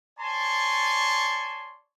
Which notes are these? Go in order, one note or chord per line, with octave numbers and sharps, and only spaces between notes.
C#5 D5 G#5 A5 C6 C#6